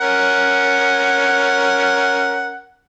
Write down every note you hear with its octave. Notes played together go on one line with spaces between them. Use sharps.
C#4 A#4 F#5